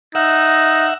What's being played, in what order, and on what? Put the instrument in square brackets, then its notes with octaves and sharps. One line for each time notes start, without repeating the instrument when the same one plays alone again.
[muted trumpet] D#4 [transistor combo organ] E5 F#5